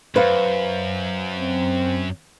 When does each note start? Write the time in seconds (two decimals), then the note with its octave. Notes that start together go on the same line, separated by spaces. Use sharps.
0.16 F#2 B4 C5 F5
1.37 C4